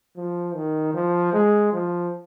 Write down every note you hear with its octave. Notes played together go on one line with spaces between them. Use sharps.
F3
D#3
F3
G#3
F3